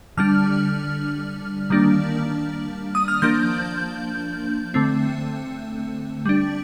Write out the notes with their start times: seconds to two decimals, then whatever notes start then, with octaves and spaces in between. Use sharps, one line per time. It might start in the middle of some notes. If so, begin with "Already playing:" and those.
0.17 D3 G3 D4 F6
1.70 D#3 G3 A#3 D4
2.95 D#6
3.08 F6
3.22 F3 A#3 D4 G6
4.74 D3 A3 C4
6.25 G3 D4